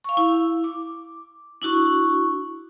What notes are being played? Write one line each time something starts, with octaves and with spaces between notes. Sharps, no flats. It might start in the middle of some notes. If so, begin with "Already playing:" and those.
F5 C#6
E4
D6
D4 E4 F#4 C#6